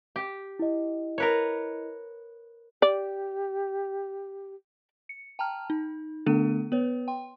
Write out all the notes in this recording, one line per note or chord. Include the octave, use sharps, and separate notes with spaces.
G4
E4 D#5
A#4 B4 C#5
G4 D5
C#7
G5 A5 A#5 F6
D#4
D3 A3 B3 D4 A4 D#7
B3 B4 C#5
G5 C6